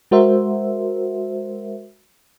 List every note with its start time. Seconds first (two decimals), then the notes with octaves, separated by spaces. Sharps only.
0.11 G#3 F#4 A#4 C5 E5